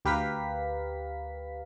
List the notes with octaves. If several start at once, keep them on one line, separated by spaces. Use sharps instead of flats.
D2 G4 A#4 B4 F5 B6